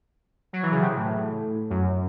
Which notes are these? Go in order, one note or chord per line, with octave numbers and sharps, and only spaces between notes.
F#3
E3
C#3
C3
A2
F#2